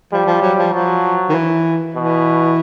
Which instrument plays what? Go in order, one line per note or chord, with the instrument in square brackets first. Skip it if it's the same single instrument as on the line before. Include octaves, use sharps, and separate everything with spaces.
[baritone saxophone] F3 [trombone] G3
[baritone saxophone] F3
F#3
F3
[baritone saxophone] F3 [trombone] F#3
[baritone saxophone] D#3
E3
[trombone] B2 [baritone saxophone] E3